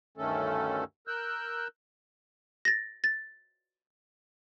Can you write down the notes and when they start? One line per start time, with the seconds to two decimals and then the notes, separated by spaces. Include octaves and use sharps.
0.18 D2 G2 D#3 A3 C#4 A4
1.08 A#4 E6 F#6 G6
2.65 A6 A#6
3.04 A6